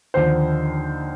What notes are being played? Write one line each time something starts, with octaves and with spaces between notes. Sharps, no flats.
D#2 D3 F3 C5